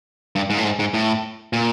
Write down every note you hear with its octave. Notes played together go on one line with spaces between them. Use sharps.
G2
G#2
A2
G#2
G#2
A2
A#2